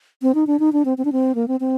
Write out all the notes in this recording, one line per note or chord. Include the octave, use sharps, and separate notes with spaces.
C4
D#4
D4
D#4
D4
C4
C4
D4
C4
A#3
C4
C4